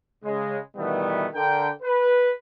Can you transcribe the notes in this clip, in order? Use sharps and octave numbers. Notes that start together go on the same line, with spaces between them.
C#3 G#3
B2 D#3 E3 G3 A3 B3
D3 A#4 G5
B4